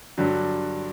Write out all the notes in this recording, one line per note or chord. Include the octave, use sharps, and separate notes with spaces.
G2 D3 F#3